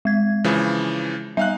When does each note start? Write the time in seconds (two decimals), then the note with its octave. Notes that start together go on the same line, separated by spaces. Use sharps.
0.05 G#3 G#6
0.44 C#3 E3 F3
1.37 G3 D#4 E5 F5 F#6